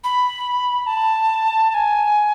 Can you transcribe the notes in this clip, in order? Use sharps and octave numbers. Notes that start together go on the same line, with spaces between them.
B5
A5
A5
G#5